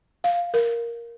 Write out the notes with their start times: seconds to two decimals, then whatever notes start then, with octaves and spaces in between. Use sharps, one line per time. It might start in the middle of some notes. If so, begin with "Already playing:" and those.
0.24 F5
0.54 A#4